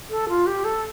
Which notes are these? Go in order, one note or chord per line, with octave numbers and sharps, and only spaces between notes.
A4
F4
G4
A4